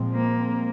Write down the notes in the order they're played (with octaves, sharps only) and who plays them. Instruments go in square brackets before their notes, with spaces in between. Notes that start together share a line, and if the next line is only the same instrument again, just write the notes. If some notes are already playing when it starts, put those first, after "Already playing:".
Already playing: [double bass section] A#2 F3 G#3 C4
[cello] A#3